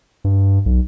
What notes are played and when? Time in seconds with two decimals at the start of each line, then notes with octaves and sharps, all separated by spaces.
0.24 G2
0.66 B1